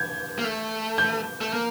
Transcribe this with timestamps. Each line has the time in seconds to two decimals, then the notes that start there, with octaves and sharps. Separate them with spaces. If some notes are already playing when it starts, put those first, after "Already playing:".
Already playing: G6 G#6
0.39 A#3
0.44 A3
0.98 G6
1.41 A3
1.53 A#3